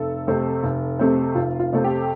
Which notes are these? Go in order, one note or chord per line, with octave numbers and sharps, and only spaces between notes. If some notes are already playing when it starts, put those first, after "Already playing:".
Already playing: F1 A4
F2 C3 A3 C4
F1
F2 C3 A3 C4
F1 F4
F4
F2 C3 A3 C4
G4